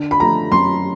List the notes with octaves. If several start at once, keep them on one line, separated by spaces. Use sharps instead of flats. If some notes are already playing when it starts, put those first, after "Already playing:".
Already playing: D3
B5
F3 A3 A#5
F#2 C6